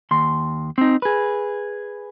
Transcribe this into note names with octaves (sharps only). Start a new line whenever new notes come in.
D#2 C6
C4 D#4
G#4 B4